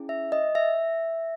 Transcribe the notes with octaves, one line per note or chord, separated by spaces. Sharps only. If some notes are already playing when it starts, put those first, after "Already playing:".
Already playing: C#4 E4 G#4
E5
D#5
E5